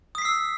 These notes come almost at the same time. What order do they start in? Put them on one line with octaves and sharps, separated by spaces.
D#6 B6 C7 E6